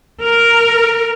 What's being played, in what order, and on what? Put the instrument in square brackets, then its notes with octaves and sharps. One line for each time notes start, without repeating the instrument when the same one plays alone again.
[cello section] A#4